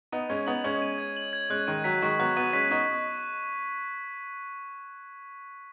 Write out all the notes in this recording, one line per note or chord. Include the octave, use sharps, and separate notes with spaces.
B3 D#4 D#7
G#3 C#4 G#6
B3 D#4 F#7
G#3 C#4 G#6
D#7
G#6
F#7
G#6
G#3 C#4 F#6
D#3 G#3 D#7
F#3 B6
D#3 G#3 C#6
F#3 B3 F#6
F#3 B3 D#7
G#3 C#4 B6
B3 D#4 C#6